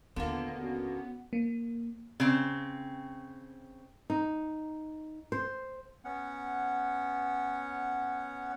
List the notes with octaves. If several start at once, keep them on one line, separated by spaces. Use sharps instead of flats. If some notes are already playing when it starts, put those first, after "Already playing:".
D#2 A#2 D3 A#3 B3 D4 F4
C#4 F#4
A#3
C#3 C4
D#4
C5
B3 C#4 F#5